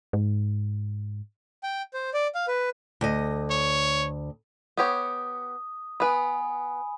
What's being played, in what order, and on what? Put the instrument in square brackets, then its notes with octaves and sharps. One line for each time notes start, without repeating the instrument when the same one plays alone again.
[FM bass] G#2
[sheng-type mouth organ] G5
C5
D5
F5
B4
[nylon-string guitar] D2 D#5
[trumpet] C#5
[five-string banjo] B3 G4 C#5 [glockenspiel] D#6
[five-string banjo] B3 B4 [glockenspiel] G#5 B5